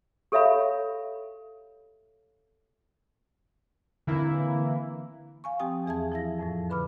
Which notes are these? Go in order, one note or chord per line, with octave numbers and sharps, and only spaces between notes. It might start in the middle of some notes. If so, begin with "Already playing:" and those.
G4 A4 C#5 E5 F5 B5
D3 E3 A#3 C4 E4
F5 G#5 C#6
F3 C4 G4 G5 G#5 D#6
E2 E3 G#4 E5 A5 G#6
F3 E4 E5 A#6
F2 A2 F3
D3 B4 B5 D6 F6